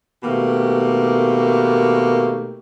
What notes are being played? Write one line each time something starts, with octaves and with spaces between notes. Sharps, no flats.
B2 D#3 A3 A#3 G4